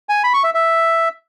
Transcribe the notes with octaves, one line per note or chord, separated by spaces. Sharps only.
G#5
B5
C#6
E5
E5